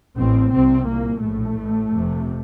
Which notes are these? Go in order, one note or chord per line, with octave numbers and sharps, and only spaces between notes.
A1 A2 C4
C2 C3 C4
C2 A#2 A#3
A#1 A2 A3
A1 A2
F1 F2 C3